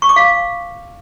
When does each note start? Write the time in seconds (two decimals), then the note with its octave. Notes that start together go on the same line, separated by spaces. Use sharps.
0.02 C#6
0.09 D6
0.16 F5